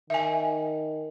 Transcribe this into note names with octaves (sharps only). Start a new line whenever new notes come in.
D#3 E5 G#5